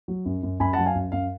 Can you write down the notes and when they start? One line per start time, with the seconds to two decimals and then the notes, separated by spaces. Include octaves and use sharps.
0.08 F#3
0.25 F#2
0.43 F#2
0.60 F#2 G#5 B5
0.73 F#3 F#5 A5
0.86 F5 G#5
0.95 F#2
1.12 F#2 F5